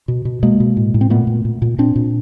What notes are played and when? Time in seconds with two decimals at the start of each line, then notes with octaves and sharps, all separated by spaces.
0.08 B2
0.25 B2
0.43 B2 G#3 A#3
0.60 B2
0.77 A2
0.94 A2
1.01 C4
1.10 A#2 A3 B3
1.27 A#2
1.45 A#2
1.62 A#2
1.78 A#2 C4 D4
1.96 A#2